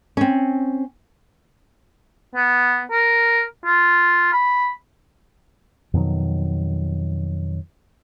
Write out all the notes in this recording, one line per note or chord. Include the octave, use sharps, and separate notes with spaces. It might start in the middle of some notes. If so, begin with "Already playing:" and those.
C4 C#4
B3
A#4
F4
B5
F2 B2 D#3 F#3